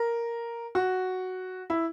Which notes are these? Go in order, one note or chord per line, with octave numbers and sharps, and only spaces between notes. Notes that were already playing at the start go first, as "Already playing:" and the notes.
Already playing: A#4
F#4
E4